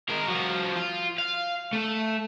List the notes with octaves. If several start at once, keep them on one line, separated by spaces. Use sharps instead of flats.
G#3 A#4
F3 F#4
F4
F5
A3